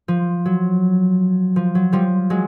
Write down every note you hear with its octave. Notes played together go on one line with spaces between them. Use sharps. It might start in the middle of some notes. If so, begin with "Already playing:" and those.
F3
F#3
F3
F#3
F3 G3
F#3 G#3